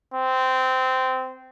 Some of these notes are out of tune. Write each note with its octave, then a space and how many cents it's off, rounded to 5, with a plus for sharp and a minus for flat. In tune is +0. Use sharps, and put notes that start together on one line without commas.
C4 -15